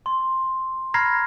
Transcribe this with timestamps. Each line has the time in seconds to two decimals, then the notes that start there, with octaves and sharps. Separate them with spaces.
0.06 C6
0.94 A#5 B5 F6 G#6 A#6 C7